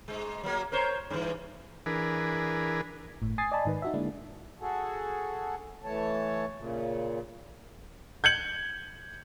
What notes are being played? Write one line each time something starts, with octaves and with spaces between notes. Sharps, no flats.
G#2 G#3
F#3 A#3
A#4 C5 C#5
G2 E3
E3 D4 G#4 A#4 B4
G1 A2
G#5 D#6 G#6 A6 C7
D5 D#5 G#5 A5 B5
G#2 D#3 B4
D#4 F#4 E5
D3 G#3 A#3 D4 E4
F#4 G#4 A4
E3 A3 C#5 A5
A#2 C#3
G6 G#6 C#7 F#7